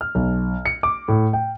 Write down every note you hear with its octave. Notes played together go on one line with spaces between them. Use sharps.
F6
B1
C#7
D6
A2
G5